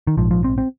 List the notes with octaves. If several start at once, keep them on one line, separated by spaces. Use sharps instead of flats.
D#3
A#1 G#2 F3
F3
C4
C4